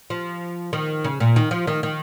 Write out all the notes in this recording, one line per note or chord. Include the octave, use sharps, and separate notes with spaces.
F3
D#3
C#3
A#2
D#3
F3
D#3
D#3